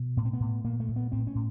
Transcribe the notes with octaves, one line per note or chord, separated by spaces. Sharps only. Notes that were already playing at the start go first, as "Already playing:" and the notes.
Already playing: B2
A2 B3
C4
B3
A2
A#2 A#3
A3
A#2
B3
A2 C4
C#4
A2